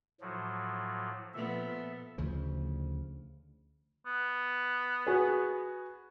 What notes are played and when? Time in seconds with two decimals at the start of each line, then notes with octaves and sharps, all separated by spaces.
0.21 A2 F3 F#3
1.33 A#2 F3 B3 A4 E5
2.18 D2 C#3 F3
4.06 B3
5.07 F#4 G#4 B4